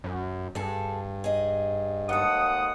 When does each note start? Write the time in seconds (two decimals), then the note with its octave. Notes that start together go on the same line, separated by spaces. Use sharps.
0.04 F#2
0.55 G2 G#4 A4
1.24 G#4 D#5
2.09 D#2 G#2 A4 F#5 D#6